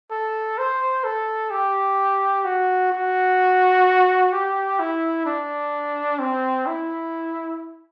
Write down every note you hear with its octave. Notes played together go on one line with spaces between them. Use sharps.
A4
C5
A4
G4
F#4
F#4
G4
E4
D4
C4
E4